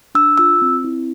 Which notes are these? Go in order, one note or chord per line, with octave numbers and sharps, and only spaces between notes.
D4 E6
F4 E6
C4
E4